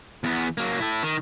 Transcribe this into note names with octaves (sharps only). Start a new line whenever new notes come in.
E2 B3
F#3 A#3
E4 A4
D#3